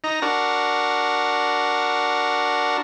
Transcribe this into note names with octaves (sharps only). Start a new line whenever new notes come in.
D#4 A#5
D4 F#4 A#4